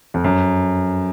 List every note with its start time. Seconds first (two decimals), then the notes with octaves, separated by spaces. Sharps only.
0.14 F2
0.24 F#2